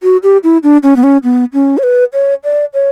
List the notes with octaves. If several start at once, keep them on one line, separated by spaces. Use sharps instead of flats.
F#4
G4
E4
D4
C#4
B3
C#4
B3
C#4
C#5
B4
C#5
D5
C#5